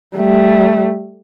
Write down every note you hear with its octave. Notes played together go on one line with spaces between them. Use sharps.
G3 A3